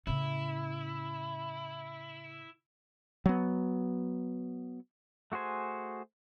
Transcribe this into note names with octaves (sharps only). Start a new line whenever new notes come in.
A2 C#3 E4
F#3 B3
A3 F#4 G#4 C5 G#5